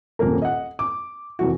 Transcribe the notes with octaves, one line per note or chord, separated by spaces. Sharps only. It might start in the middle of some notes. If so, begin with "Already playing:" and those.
D#1 F2 A#3 A#4
D#5 F#5
D6
F1 E3 F#4